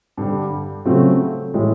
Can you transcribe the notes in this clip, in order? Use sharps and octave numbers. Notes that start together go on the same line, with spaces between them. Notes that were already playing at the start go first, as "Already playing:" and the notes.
G2 D3 G3
C#3 F#3 A3 C4 F4
A2 E3 G#3